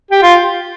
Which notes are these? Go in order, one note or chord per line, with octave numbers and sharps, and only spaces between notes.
G4
F4